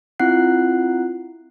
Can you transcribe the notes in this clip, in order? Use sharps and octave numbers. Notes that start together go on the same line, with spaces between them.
C4 E4 F4 F#5 F#6 C7